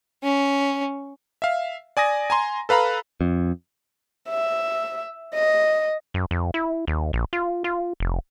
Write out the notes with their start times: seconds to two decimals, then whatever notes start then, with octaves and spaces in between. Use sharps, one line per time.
0.23 C#4
1.42 E5 F5
1.97 D5 G#5 D#6 A#6
2.30 G#5 A#5 C6
2.69 A4 B4 F5 A#5 B5
3.21 F2
4.29 E5
5.34 D#5
6.14 F#2
6.31 F2
6.54 E4
6.87 D#2
7.13 A#1
7.33 F4
7.64 F4
8.00 F1